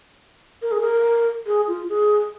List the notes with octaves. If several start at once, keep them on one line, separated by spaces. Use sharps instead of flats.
A#4
G#4
A#4
G#4
F4
G#4